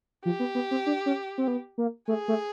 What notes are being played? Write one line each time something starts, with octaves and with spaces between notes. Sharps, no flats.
F3 G4
B3
B3
C4
D4
C#4
C4
B3
A#3
A3 G#4
A3